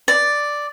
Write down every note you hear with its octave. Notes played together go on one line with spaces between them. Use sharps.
D5